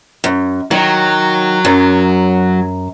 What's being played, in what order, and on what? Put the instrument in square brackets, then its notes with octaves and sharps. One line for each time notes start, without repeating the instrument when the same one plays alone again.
[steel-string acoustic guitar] F#2
[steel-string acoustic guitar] D#3 [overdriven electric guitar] F#3
[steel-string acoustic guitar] F#2